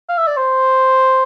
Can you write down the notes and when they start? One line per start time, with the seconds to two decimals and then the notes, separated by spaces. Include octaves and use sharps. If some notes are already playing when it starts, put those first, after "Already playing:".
0.09 F5
0.18 E5
0.27 D5
0.37 C5